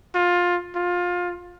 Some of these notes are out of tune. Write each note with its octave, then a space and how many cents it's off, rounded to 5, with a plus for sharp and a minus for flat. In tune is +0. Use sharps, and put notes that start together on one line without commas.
F4 +15
F4 +20